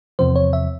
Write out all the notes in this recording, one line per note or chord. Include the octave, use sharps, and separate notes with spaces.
E2 C3 F3 C5
C#5
E5